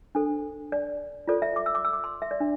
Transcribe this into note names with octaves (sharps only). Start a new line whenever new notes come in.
D4 A4 C5
D5
F4 A4 C5 D5
E5
D6
E6
D6
E6
D6
C6
E5
D5
D4